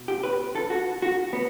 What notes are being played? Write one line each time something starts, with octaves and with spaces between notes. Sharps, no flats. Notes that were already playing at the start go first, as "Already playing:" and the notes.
Already playing: B2
G4
B4
A4
F#4
F#4
B3